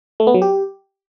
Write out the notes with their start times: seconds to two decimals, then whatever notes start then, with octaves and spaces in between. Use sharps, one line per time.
0.20 A3
0.27 B3
0.34 F#3
0.42 G4